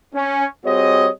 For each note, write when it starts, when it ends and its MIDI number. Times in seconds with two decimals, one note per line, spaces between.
0.15 0.45 61
0.65 1.09 55
0.65 1.09 60
0.65 1.09 66
0.65 1.09 68
0.65 1.09 73
0.65 1.09 75